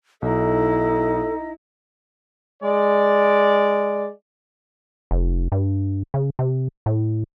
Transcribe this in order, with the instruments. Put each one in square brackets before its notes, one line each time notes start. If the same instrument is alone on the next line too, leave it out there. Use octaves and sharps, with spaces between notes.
[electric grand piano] B1 [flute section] D#4 D#5 [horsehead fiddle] E4 [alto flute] A4
[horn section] G#3 D5
[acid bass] F1
G2
C#3
C3
A2